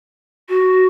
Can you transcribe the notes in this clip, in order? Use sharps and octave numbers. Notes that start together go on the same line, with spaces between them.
F#4